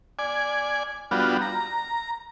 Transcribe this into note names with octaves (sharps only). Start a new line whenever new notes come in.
D5 G#5
G3 B3 D4 F4 F#4
A#5